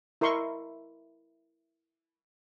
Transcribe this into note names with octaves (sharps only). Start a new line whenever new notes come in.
E4 A#4 D#5 C6 C#6